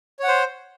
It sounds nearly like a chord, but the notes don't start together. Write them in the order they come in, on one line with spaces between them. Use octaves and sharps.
C#5 F#5 C5